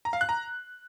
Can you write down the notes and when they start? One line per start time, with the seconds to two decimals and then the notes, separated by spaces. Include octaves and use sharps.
0.05 A#5
0.13 F5
0.21 F#6
0.29 A#5